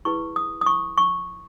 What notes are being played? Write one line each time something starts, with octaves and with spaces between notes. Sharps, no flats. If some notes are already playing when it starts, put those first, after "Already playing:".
E4 G#4 B4 C#6
D#6
D#6
C#6
C#6